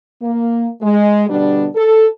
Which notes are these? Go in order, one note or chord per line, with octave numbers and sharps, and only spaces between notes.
A#3
G#3
B2 D3 G3 B3 D4
A4